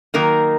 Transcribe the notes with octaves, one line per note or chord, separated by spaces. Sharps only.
D#3 F#3 A#3 D#4 A#4